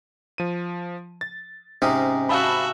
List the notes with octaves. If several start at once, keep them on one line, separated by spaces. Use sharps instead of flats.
F3 D#7
A6
G#2 C3 C#4 D#4
F#4 E5 F5 A5 B5